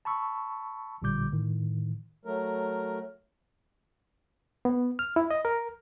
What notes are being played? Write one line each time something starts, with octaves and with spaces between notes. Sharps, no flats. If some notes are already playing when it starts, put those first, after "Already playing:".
A5 B5 C#6 E6
A1 A#2 D3 G3 D6 G6
A2 D#3
F#3 A3 A#4
B3
F6
E4
D#5
A#4